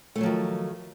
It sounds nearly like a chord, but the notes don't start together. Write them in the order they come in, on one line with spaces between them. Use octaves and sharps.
A3 D3 F#3 F3 D#3